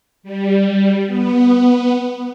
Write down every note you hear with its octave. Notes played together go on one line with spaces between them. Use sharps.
G3
B3